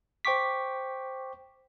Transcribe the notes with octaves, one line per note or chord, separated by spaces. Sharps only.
C5 G5 C#6 D6 B6